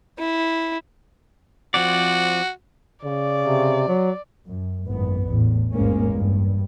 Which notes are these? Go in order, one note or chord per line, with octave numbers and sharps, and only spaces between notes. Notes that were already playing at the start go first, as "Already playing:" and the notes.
E4
F3 C4 F#4 D5
C#3 D5
C3
F#3
F#2
G#1 F#2 A2 B3
A1 E2 A2
A1 E2 G#2 G#3 A#3 C#4
G2